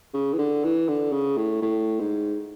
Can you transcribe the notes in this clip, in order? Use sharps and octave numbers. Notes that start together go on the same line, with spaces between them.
C#3
E3
D3
E3
D3
C#3
A2
A2
G#2